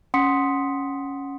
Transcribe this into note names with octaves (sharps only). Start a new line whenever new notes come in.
C#4 F#5 C6 D#6 B6 C#7